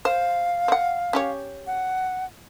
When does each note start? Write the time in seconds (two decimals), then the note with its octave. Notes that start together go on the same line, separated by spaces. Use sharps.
0.05 C5 F5
0.68 C4 F#5
1.13 C#4 G4 C#5
1.67 F#5